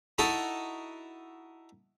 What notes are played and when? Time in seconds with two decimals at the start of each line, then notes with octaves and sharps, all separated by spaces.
0.18 D#4 E4 F#4 A4